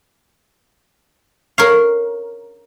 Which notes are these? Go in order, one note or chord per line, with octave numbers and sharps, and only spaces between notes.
A#4 C#5 F5